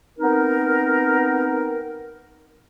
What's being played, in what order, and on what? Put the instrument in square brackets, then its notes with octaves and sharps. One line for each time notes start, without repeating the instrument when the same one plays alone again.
[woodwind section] B3 C4 D#4 A#4